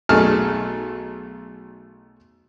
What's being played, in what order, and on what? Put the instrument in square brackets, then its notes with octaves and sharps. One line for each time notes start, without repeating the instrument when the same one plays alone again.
[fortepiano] B1 A3 D#4 G#4 A5 F6